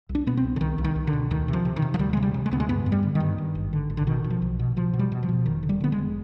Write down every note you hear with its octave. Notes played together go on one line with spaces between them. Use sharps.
C2
D4
B2 B3
C4
C2
D3
C2 D#3
C2
D#3
C2
D3
B2
D2 D#3
C3
F3
C3
D#3
C3
F3
D2 G3
C3 G#3
G3
C3
G#3
D2 B3
G#3
G2 B3
G2
G3
D3
D#3
G2
G2
G#1
D3
G#1
D3
B2 D#3
B2
F3
B1
B2
B2 F3
B2
G3
B2
F3
B2
F1 D#3
D3
G3
D3 B3
G#3
F1